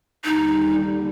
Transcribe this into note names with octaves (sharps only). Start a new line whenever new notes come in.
D#2 D3 G3 D#4